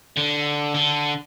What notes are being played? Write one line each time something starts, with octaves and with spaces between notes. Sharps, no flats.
D3
D3